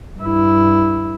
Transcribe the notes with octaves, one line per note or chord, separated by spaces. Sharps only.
G2 E4